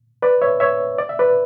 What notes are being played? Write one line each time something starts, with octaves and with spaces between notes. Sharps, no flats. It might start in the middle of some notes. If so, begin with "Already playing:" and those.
B4 D5
C#5 E5
C#5 E5
D5
E5
B4 D5